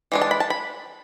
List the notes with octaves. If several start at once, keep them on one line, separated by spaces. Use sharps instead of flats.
E3 G#3 D4
A5
B5
A5
B5